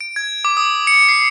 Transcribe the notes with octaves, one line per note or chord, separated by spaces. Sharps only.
D7
G#6
D6
D#6
C#7
C7